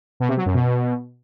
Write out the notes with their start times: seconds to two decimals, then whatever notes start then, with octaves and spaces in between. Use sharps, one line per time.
0.20 B2
0.29 C3
0.37 F#3
0.46 F#2
0.54 B2